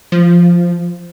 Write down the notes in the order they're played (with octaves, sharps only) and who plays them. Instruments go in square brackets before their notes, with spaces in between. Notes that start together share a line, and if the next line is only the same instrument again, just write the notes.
[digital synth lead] F3